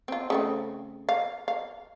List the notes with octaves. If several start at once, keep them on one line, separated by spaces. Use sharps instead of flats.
C4 F4
C#3 A3 C4
F5
F5